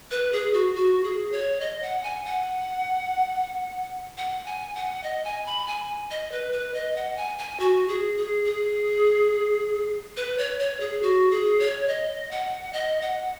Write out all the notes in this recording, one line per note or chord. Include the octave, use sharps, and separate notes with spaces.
B4
G#4
F#4
F#4
G#4
C#5
D#5
F#5
G#5
F#5
F#5
G#5
F#5
D#5
G#5
B5
G#5
D#5
B4
B4
D#5
F#5
G#5
G#5
F#4
G#4
G#4
G#4
B4
C#5
C#5
G#4
F#4
G#4
C#5
D#5
F#5
D#5
F#5